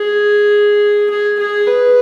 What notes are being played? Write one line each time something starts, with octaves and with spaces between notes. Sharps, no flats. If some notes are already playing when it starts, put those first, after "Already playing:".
Already playing: G#4
G#4
G#4
B4